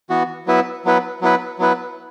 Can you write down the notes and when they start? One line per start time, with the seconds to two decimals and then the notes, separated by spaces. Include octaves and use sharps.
0.10 E3 B3 F#4
0.47 F#3 B3 E4 B4
0.85 F#3 B3 E4 B4
1.21 F#3 B3 E4 B4
1.59 F#3 B3 E4 B4